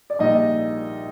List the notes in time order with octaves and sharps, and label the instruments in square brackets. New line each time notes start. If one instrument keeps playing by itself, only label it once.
[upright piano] D5
A#1 A#2 G3 D#4 D#5